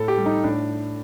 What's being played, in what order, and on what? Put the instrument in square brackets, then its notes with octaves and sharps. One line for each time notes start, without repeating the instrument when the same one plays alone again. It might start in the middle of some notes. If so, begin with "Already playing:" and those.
Already playing: [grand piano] A2 A4
G4
G3
D#4
A2 D4